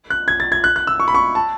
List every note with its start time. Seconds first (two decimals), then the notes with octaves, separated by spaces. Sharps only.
0.10 F#6
0.28 G#6
0.40 A6
0.52 G#6
0.64 F#6
0.76 F#6
0.87 E6
1.00 C#6
1.08 B5
1.15 C#6
1.35 A5